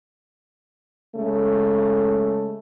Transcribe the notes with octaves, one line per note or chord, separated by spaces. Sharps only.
C#3 G#3 A3